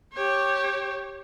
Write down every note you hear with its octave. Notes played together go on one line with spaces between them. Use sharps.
G4 C#5